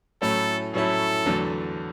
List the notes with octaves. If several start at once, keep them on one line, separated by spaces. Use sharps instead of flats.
A2 F#3 A3 C#4 E4 A4
A2 F#3 A3 C#4 E4 A4
E2 D3 F#3 A3